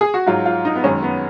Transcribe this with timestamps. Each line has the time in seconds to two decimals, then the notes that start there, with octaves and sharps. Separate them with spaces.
0.01 G#4
0.14 F#4
0.26 G#2 F#3 F4
0.45 F4
0.65 D#4
0.75 B3
0.84 F#2 D#3 G#3 C#4
1.03 B3